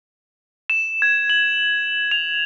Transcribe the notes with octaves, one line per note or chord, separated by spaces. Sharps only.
E7
G#6
F#7
F7